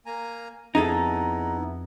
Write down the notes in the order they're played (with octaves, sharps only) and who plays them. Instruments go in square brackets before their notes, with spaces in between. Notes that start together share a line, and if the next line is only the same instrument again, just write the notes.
[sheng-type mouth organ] A#3 G#5 A#5
[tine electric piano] F2 [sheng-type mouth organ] B3 E4 [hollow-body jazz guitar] D#4 G#4 A4 [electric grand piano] A#5